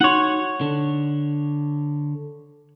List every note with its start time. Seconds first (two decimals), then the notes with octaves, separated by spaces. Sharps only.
0.01 D#4 F#4 C#5 F#5 C6
0.61 D3